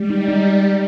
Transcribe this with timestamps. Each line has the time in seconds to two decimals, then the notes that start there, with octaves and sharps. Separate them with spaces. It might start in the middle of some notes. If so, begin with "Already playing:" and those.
Already playing: G3 G#3
0.10 D#4
0.28 D#4